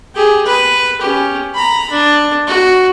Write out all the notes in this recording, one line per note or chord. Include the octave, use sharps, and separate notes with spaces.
G4 G#4
B4
C#4 G4
A#5 B5
D4
F#4